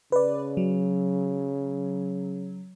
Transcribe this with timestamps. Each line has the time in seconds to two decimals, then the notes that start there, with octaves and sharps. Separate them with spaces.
0.12 C#3 B4 D5
0.57 F#3